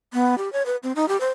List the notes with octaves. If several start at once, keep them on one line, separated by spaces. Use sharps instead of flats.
B3
G4
C#5
B4
C4
D#4
G4
C5